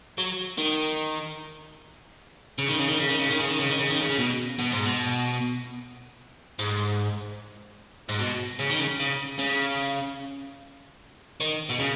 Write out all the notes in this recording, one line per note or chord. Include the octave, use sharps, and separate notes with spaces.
F#3
D#3
C#3
D#3
C#3
D#3
C#3
D#3
C#3
D#3
C#3
D#3
C#3
D#3
C#3
D#3
C#3
C#3
B2
B2
G#2
B2
G#2
G#2
B2
C#3
D#3
C#3
C#3
C#3
D#3
B2
C#3